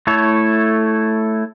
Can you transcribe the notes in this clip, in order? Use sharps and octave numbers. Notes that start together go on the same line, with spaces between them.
A3 E4 A4 C#5